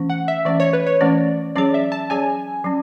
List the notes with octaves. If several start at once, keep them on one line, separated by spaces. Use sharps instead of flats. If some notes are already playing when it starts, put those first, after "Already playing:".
Already playing: E3 A3 C#4
F#5
E5
E3 A3 C#4 D5
C#5
B4
C#5
E3 A3 C#4 D5
F#3 C#4 G#4 C#5 D5
E5
A5
F#3 C#4 G#4 C#5 G#5
F#3 C#4